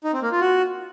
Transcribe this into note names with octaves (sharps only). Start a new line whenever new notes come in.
D#4
C4
A#3
F4
F#4